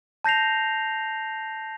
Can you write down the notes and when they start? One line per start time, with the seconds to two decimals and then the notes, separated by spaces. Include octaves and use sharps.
0.24 A5 G6 A#6 C7 F7